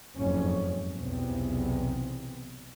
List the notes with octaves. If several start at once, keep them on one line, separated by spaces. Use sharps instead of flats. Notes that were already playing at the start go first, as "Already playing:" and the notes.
F#1 F2 G#2 C#4
B1 E2 C3